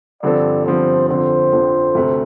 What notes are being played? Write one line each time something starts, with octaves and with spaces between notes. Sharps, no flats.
G2 D3 F3 C4 A4 D5
G2 D3 F3 C4 A4 C5
F2 D3 F3 C4 C5
F2 D3 F3 C4
D2 C3 A3